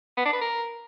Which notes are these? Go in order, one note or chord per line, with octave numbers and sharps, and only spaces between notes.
B3
D4
B4
A#4